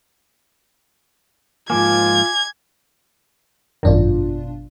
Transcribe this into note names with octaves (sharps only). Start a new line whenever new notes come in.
G#2 F3 A#3 F4 G#5 D6 G#6
G#1 F#2 B2 D#3 D4 F4